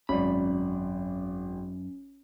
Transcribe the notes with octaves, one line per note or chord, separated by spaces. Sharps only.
G#1 F#2 C#4 D5 B5